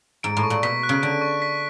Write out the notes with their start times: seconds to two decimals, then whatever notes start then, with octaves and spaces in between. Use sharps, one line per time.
0.23 G#2 D7
0.37 A2
0.43 C#6
0.50 A#2
0.63 B2 B6
0.83 F#6
0.89 C#3
1.02 D3 D7
1.21 C#6
1.42 B6